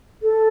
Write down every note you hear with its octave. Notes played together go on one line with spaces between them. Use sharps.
A4